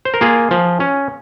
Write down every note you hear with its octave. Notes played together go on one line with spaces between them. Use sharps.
C5
A#4
A#3 F4 G#4
F3
C#4